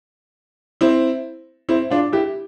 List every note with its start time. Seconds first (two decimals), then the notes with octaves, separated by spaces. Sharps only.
0.81 C4 E4
1.69 C4 E4
1.90 D4 F4
2.13 E4 G4